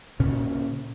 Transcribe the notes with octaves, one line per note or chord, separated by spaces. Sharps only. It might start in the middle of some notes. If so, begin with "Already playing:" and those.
D2 A#2 C#3 C#4